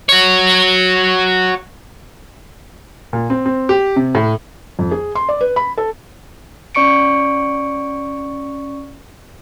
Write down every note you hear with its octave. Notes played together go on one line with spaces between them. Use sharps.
F#4 C#5
A#2
C4
C4
G4
C3
A2
F2
G#4
C6
D5
B4
B5
A4
C#4 D5 C#6 C#7 D7